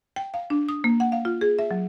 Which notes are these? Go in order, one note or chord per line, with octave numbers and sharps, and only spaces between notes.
G5
F5
D4
D#6
A#3
F#5
F5
F4
G#4
E5
F#3